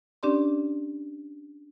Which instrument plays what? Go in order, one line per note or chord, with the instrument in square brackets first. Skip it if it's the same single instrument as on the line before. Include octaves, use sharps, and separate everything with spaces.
[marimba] C#4 D4 G4 D5 C6